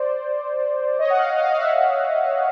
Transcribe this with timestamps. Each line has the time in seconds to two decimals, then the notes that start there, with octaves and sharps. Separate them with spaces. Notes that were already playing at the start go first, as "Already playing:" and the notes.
Already playing: C5 D5
0.99 C#5 D#5
1.10 F#5
1.18 D#5 F5
1.37 D#5 F5
1.51 F5
1.57 E5 F#5